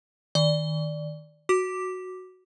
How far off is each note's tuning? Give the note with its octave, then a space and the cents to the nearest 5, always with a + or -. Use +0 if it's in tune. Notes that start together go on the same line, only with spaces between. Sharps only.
D#3 +0 D5 +0
F#4 +0 D6 +0